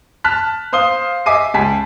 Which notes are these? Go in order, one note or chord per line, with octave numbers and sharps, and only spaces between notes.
A5 F6 F#6 B6
C5 F5 D#6 G7
D#5 E5 G#5 D6 C7 D#7
C#2 G#5 A5 B6